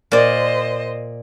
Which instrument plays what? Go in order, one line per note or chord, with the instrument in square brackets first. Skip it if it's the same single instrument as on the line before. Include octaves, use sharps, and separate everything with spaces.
[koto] A#2 D5 [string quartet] C5 D#5